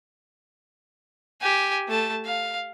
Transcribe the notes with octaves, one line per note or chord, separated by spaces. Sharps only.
G4 G#5
A3 A5
F5